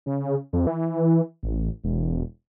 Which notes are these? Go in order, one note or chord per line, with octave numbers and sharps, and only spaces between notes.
C#3
F2
E3
A1
E1